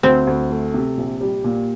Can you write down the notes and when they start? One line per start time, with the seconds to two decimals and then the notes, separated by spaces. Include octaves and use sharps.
0.03 D2 C4
0.27 D2
0.51 A3
0.74 C3
0.97 A#1
1.21 G3
1.44 A#2